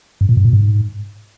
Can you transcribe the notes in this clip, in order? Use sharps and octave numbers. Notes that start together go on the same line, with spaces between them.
G2
A#2
G2
A#2
G#2